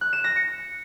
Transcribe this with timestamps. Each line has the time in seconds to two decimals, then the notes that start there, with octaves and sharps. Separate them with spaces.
0.01 F#6
0.13 E7
0.24 A#6
0.36 C#7